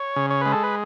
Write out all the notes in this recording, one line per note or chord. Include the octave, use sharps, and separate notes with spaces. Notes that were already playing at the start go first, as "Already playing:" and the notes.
Already playing: C#5
C#3
C#5
G#3 B4
A4
B4